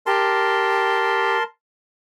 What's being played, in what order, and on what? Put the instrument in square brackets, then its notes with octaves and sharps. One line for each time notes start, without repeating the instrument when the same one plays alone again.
[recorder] G4 [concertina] A#4 A5 C6